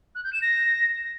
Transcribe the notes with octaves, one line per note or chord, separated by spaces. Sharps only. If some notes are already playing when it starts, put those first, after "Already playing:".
F#6
G6
E7
A#6